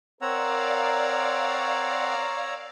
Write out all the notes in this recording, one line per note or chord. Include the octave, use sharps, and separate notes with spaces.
C4 A#4 C#5 D5 F5 F#5 A#5 E6